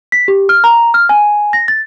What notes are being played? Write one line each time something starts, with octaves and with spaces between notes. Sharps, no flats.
B6
G4
F6
A#5
F6
G#5
A#6
A6